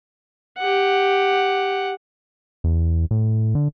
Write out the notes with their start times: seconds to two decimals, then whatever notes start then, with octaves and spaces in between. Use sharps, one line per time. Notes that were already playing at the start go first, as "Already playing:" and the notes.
0.58 G4 F#5
2.64 E2
3.11 A2
3.55 D3